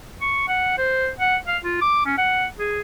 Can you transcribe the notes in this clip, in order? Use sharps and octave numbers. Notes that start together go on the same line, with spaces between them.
C#6
F#5
C5
F#5
F5
F4
D6
C#4
F#5
G#4